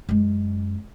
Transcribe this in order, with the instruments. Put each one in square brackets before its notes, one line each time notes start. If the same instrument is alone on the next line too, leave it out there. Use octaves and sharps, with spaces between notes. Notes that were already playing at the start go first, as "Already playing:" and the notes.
[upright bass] F#2 G#3